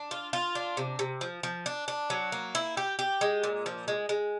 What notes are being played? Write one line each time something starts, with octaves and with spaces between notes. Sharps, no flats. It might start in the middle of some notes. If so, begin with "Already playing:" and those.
Already playing: D4
F4
F4
D4
C3
C3
F3
F3
D4
D4
F#3
A#3
E4
G4
G4
G#3
A#2
F3
G#3
G#3